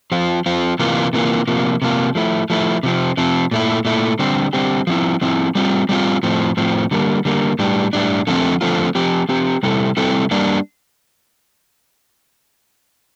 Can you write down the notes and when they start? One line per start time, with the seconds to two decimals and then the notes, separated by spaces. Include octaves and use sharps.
0.12 F3 C4 F4
0.46 F3 C4 F4
0.79 C3 E3 A#3 F4
1.13 C3 E3 A#3 F4
1.48 C3 F3 A#3 F4
1.82 C3 F3 A#3 F4
2.15 F3 A3 E4
2.50 F3 A3 E4
2.83 C3 F3 C4
3.17 C3 F3 C4
3.51 A#2 A3 E4
3.85 A#2 A3 E4
4.19 D3 G3 C4 G4
4.53 D3 G3 C4 G4
4.87 F3 C4 E4
5.21 F3 C4 E4
5.55 G3 C4 F4
5.89 G3 C4 F4
6.23 A2 F3 C4
6.57 A2 F3 C4
6.91 D3 G3 A#3
7.25 D3 G3 A#3
7.59 A2 G3 D4
7.93 A2 G3 D4
8.27 D3 F3 A3 C4 F4
8.61 D3 F3 A3 C4 F4
8.95 F3 C4 G4
9.29 F3 C4 G4
9.63 C3 G3 C4 E4 A4
9.97 C3 G3 C4 E4 A4
10.31 G3 A#3 D4